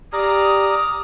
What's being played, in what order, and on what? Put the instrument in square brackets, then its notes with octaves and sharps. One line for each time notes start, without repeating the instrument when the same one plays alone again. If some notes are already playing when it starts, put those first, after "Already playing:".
[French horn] G4 [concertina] D5 A#5 F6 [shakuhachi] D#6